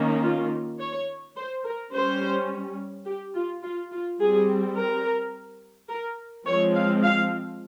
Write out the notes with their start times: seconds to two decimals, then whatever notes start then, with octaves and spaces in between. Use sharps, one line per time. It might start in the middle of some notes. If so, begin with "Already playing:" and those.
Already playing: D#3 A#3 C#4
0.23 F4
0.80 C#5
1.36 C5
1.64 A#4
1.93 G3 C#4 C5
3.06 G4
3.35 F4
3.63 F4
3.91 F4
4.19 G3 C4 G#4
4.76 A#4
5.89 A#4
6.47 F3 G#3 C4 C#5
6.75 F5
7.03 F5